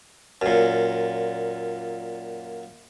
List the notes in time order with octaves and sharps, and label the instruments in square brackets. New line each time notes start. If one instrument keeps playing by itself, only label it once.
[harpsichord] F#2 A#2